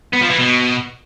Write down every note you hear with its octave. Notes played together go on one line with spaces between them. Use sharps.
B3
F3
E3
B2